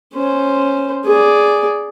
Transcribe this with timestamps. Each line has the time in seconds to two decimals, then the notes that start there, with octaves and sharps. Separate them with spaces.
0.15 C#4 C5
1.05 G#4 D5